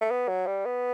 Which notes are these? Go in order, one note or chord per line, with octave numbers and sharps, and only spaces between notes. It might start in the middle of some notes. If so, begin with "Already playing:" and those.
A3
B3
F#3
G3
B3